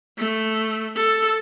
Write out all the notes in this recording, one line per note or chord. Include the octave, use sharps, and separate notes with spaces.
A3
A4